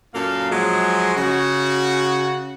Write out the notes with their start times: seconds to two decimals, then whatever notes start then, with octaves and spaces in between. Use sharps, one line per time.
0.14 F#2 A#2 A#3 A4 F5
0.51 F3 F#3 G#3
1.16 C#3 F#4